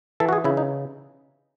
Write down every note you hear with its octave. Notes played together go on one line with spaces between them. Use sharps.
E3 A4
F#4
G#4
C#3 E4
D#4